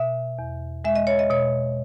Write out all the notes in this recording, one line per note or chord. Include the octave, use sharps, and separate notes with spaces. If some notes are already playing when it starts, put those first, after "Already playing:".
Already playing: B2 E5
E2
G#3 E5
D#5
C#5
D#5
B2 C#5